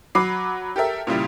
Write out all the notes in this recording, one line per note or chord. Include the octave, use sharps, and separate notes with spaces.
F#3 B5 D6 C7
G4 A4 A#4 E5
A#2 C#3 G3 E4